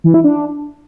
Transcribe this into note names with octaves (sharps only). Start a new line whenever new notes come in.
E3
E4
D4